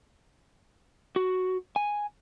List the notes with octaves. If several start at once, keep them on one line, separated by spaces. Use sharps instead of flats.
F#4
G#5